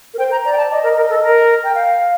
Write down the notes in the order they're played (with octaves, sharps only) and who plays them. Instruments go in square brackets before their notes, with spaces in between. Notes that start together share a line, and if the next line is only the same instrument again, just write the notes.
[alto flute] A#4
[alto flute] C5 [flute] G5
[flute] A#5
[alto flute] D5 [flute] A#5
[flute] G5
A5
[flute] D5 [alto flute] D#5
[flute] A#4
A#4
A4
A#4
[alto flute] G5
F5